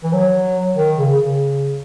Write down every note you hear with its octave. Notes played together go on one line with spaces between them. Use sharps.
E3
F#3
D#3
C#3
C#3